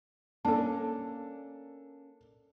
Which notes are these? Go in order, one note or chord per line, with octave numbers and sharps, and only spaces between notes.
A#3 C#4 D4 A4 A5